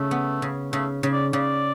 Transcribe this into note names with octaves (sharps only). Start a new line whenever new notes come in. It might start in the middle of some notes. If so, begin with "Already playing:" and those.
Already playing: C#3 A3
B3
C#3
C#3 A3
C#3
D5
C#3 D5